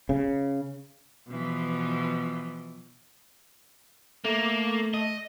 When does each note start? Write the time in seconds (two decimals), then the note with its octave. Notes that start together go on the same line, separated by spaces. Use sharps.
0.09 C#3
1.28 B2 E3 F3
4.24 A3 A#3
4.94 D#5